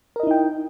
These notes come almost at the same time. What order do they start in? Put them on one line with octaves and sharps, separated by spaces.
A#4 D#5 E4 D#4 G5